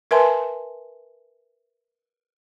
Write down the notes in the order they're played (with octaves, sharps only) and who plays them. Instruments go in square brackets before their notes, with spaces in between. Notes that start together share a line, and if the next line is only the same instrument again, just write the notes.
[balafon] A#4 B4 E5 G#5 A5 C6